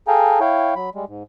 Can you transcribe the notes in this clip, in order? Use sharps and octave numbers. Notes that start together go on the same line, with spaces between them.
G#4 A4 F5 G5 G#5 A#5
E4 C#5 F5 G5
F#3 B5
G3 G#3
G#2